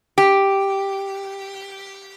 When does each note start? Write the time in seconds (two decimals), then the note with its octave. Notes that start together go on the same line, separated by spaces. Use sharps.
0.18 G4